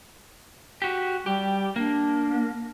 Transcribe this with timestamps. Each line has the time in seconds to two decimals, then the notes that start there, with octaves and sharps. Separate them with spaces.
0.82 F#4 G4
1.26 G3 G4
1.76 A#3 D4